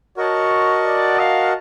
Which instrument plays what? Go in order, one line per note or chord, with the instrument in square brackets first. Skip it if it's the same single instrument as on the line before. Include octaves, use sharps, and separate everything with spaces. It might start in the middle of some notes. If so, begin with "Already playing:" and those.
[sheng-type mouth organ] F#4 A#4 D#5 F#5 A5 [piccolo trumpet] C#5
[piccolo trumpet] D5
F5